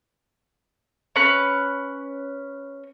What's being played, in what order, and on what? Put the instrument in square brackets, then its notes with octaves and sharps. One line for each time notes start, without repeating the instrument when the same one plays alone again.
[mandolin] C#4 B4